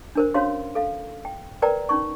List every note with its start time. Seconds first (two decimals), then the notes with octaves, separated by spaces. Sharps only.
0.15 D4 A#4 C5
0.34 C#4 F#4 C5 C#5 F5 C6
0.75 A4 F5
1.25 G5
1.62 A#4 B4 D5 G5 A#5
1.89 C#4 D#4 C#6